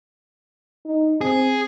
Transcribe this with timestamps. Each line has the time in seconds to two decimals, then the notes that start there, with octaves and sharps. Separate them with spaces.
0.85 D#4
1.21 C4 G#4